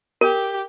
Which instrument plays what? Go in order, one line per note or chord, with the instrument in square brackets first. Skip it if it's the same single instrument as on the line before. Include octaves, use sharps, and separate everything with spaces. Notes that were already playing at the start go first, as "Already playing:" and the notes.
[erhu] G4 [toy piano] A#4